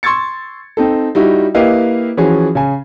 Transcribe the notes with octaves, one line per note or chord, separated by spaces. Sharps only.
C6 C#6 E6 G#6 A6 C#7
C4 D#4 A4
G3 D#4 E4 F#4
A#3 E4 G4 B4 D#5 F5
E3 F3 C#4 F#4 G#4
C#3 G#5